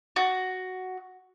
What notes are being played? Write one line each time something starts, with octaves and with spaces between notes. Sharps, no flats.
F#4